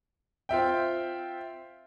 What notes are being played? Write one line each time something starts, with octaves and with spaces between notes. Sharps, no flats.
C4 F4 E5 G5